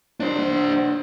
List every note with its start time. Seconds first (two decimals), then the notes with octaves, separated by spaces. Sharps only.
0.20 D4 C5